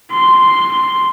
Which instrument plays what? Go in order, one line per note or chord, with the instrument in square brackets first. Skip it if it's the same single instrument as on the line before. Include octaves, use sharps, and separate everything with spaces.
[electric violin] C6